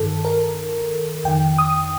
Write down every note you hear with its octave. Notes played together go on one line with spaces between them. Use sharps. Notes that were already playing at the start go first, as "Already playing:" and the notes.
Already playing: G2 D#3 A4
A#4
F2 D#3 G5
D#6